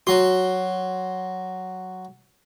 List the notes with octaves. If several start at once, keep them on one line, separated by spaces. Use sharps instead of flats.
F#3 F#4 C6